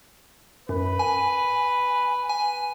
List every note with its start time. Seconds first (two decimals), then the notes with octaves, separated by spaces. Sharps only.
0.69 F#2 B4
0.99 G#5
2.29 G#5